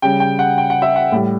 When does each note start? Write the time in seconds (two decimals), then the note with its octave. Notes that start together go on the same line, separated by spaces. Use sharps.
0.02 C#3 G3 G5
0.20 G5
0.39 F#5
0.58 G5
0.70 F#5
0.82 E5
0.96 F#5
1.12 A2 G3